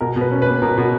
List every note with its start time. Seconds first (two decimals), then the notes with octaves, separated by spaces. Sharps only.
0.01 B2 A#4
0.16 B2
0.21 B4
0.31 C#4
0.42 B4
0.46 A#3
0.62 B2 A#4
0.78 B2